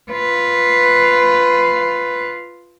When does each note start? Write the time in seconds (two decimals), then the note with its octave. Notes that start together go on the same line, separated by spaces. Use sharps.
0.11 F4 B4